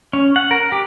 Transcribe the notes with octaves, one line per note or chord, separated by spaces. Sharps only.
C#4
F#5
A#4
G4